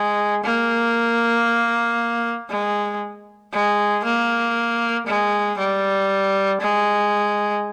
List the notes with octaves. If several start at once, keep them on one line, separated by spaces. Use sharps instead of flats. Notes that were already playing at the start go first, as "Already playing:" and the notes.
Already playing: G#3
A#3
G#3
G#3
A#3
G#3
G3
G#3